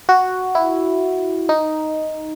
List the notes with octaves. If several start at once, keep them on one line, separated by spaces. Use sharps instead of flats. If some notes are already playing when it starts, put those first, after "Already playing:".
F#4
E4
D#4